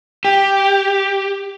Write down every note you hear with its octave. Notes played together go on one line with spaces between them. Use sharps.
G4